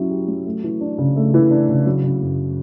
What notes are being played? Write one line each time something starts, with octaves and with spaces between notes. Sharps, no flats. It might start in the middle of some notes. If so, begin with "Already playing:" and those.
Already playing: F#3 C#4 E4
G4
F#3
A3
E3
D4
C#3
A3
E3
D4
C#3
F#3
C#3
F#2